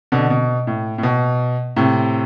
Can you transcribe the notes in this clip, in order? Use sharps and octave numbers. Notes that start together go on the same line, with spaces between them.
B2 D3
B2
A2
A2
B2
A2 C3